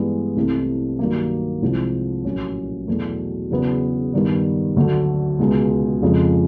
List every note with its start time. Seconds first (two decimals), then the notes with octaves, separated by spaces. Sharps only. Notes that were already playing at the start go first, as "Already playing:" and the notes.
Already playing: G2 E3 G#3 B3
0.36 C2 C3 E3 A3
0.99 G2 D#3 F#3 A#3
1.62 C2 C3 F3 G#3 C4
2.24 A#1 A2 F#3 A#3 C#4
2.87 E2 B2 F#3 A3
3.51 E2 C#3 F#3 B3
4.13 G2 D#3 G3 B3
4.76 D2 D3 F#3 A3
5.39 C#2 B2 G#3
6.02 F2 C#3 F3 G#3